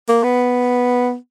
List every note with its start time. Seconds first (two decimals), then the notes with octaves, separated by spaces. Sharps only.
0.09 A#3
0.23 B3